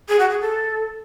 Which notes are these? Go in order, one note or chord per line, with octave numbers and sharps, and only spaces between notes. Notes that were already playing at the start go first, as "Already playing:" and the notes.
G#4
F#4
G#4
A4